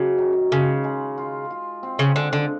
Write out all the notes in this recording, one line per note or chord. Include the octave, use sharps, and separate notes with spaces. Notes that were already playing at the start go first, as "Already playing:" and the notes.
Already playing: F#2 C#3 F#3
D#3
C#3 G#3
G#3
F4
F4
C4
C#3
D3 G#3
D3